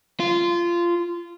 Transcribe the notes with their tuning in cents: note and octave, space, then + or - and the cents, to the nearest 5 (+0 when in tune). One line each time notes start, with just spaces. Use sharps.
F4 -15